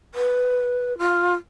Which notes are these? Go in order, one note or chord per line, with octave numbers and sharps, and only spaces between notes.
B4
F4